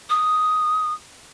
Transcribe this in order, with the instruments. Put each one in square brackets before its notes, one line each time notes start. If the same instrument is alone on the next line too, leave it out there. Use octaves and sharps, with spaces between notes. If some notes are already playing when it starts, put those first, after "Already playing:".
[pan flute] D#6